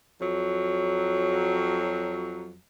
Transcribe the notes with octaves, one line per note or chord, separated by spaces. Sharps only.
F2 F#3